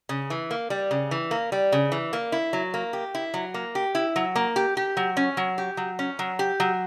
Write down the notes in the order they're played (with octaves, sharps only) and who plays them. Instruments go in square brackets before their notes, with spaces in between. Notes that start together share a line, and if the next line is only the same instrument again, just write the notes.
[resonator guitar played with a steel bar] C#3
E3
A#3
G3
C#3
E3
A#3
G3
C#3
E3
A#3
E4
F#3
A#3
G4
E4
F#3
A#3
G4
E4
F#3
A#3
G4
G4
F#3
C#4
F#3
G4
F#3
C#4
F#3
G4
F#3